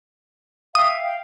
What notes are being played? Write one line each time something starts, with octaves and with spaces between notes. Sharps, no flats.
E5 F5 G5 D#6
F5 G5